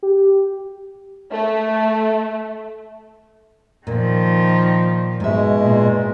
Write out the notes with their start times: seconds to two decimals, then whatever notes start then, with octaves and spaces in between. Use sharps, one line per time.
0.03 G4
1.33 A3
3.87 A#2 D#3 F3
5.20 G#2 B2 G#3 E5
5.57 A#2